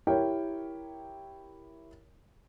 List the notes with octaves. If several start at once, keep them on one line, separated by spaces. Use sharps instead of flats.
E4 G4 A#4 C#5 G5